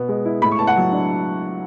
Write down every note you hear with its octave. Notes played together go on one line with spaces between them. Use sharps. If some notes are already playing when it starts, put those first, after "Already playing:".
Already playing: B2 B3
G#3
E4
A2 B5
C#6
B3 A5
F#5
F#3
D4